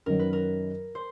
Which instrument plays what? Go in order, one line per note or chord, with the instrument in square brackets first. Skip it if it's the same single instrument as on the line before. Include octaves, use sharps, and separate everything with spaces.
[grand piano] F#2 D#3 F#3 [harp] A#4
[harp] B4
A#4
C5